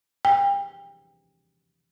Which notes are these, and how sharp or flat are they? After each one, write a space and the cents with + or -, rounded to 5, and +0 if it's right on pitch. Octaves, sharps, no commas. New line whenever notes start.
G5 +35